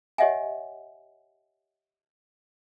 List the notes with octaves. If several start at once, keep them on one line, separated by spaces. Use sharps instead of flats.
G4 C#5 D#5 E5 F#5 G#5